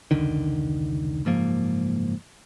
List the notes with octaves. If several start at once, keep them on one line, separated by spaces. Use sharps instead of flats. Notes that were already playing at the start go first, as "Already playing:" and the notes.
F1 C#2 D3 D#3
F#1 G#2 F3 A#3